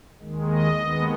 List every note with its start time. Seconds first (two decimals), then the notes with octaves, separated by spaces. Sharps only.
0.21 D#2 D#3 G#3
0.50 D#5
0.80 D#2 D#3 G#3 B3